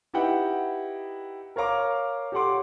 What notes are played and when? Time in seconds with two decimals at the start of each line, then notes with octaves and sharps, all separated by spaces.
0.14 D#4 E4 G4 B4 F#5 G5
1.56 A#4 C#5 F5 A#5 D6
2.32 G4 A4 C#5 F#5 C6 D6